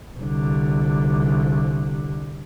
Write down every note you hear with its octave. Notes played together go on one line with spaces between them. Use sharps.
C2 D3